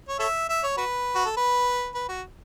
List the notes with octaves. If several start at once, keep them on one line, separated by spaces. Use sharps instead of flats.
C#5
A4 C#5 E5
E5
C#5
F#4 B4
F#4
A4
B4
B4
F#4